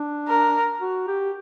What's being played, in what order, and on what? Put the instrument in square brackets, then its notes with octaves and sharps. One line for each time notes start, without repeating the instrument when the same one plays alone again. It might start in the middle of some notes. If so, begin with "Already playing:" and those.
Already playing: [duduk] D4
[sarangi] A#4
[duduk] F#4
G4